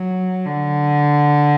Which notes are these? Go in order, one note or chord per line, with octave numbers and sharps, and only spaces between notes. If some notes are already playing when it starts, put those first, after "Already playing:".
Already playing: F#3
D3